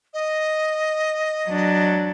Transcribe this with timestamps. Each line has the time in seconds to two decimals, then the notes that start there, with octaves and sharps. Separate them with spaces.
0.14 D#5
1.48 F#3 D4